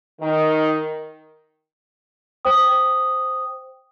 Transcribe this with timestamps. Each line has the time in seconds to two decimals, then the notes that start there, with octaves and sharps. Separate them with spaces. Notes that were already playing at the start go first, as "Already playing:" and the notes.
0.21 D#3
2.45 C5 G5 D#6